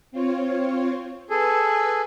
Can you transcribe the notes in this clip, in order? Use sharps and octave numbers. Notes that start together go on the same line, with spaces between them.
C4 F4 C#5
G#4 A4 B4 G#5 E6